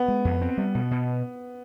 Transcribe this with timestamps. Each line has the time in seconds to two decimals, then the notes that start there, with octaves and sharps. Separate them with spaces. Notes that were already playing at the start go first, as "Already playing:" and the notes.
Already playing: B3
0.08 G#3
0.25 F2
0.42 C4
0.57 G3
0.75 B2
0.91 B2